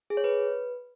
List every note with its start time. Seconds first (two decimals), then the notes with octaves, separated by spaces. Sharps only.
0.10 G#4
0.17 C#5
0.24 B4